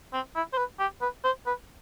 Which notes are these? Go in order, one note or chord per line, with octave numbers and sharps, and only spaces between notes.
C4
E4
C5
B4
G4
B4
C5
B4